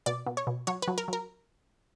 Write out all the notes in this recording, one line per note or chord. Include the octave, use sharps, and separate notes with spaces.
B2 D5
B2
C#5
B2
F#3 C#5
B4
F#3
A#4
F#3 A#4